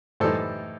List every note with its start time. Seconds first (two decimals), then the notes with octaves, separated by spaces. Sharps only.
0.20 A2 E3 G3 D#4 A4 C5